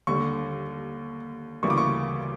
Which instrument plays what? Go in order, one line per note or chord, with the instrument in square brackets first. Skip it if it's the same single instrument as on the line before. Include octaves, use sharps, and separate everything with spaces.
[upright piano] D#2 D3 G3 C#6
D2 C#3 E3 G3 A#3 C#6
D6
C#6